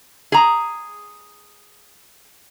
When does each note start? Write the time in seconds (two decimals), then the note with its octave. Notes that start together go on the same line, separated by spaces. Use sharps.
0.32 G#4 A#5